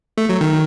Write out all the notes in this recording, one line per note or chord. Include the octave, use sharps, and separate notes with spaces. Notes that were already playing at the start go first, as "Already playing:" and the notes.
A3
F#3
D#3